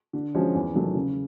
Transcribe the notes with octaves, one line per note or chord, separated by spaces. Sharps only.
D3
F3 G#3 C#4 F#4
E2
C3 D#3 F#3 A3
C#3